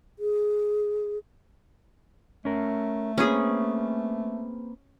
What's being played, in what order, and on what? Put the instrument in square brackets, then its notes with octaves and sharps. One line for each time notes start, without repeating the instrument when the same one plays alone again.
[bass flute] G#4
[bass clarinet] A3 [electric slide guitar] C#4 A#4
[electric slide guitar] A#3 C4 B4 [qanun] C#4 G#4